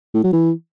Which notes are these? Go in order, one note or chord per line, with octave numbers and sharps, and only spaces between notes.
A2
F#3
E3